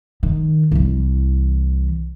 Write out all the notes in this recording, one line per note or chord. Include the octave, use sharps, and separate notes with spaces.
D#3
C2 E3